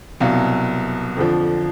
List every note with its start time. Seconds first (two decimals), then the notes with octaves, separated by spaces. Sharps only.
0.20 C2 B2 F#3 F5
1.17 F2 D3 F3